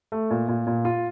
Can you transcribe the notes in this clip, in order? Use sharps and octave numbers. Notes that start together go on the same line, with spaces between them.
A3
A#2
A#2
A#2
F4